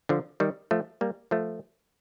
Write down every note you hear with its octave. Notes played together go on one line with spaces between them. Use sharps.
D3 F3
D#3 G3
F3 A3
G3 A#3
F3 A3